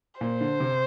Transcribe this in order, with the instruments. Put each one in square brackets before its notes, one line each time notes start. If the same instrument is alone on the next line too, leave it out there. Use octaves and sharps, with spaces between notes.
[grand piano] A#2 [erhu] C5
[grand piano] D3
C3